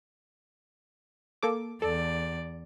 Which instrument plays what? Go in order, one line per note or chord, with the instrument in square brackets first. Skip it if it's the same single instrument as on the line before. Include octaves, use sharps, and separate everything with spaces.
[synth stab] A#3 A4 D6
[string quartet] E2 D5 [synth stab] A4